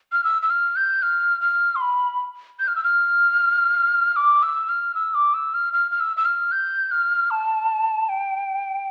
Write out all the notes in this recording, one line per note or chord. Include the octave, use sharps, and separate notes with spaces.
F6
E6
E6
F6
G6
F6
F6
C6
B5
G6
F6
E6
F6
D6
E6
F6
E6
D6
E6
F6
F6
F6
E6
E6
F6
G6
F6
A5
G5